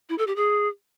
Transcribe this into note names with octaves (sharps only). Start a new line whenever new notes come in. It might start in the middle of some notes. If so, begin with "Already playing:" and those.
E4
A4
G4
G#4